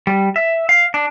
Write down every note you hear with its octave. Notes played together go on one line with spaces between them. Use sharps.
G3
E5
F5
D4